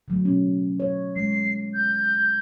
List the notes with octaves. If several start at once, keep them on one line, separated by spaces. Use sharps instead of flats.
D3 F#3 A3
B2 C#4
C#5
G#3 C7
G6